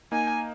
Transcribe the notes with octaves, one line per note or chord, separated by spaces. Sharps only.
A#3 D#4 G#5